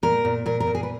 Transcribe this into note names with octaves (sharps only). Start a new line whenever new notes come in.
A#2 A#4
A#2
A#2 A#4
A#4
A#2
G#4
B4